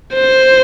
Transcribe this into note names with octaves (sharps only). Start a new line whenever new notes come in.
C5